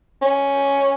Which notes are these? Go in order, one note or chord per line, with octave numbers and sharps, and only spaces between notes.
C#4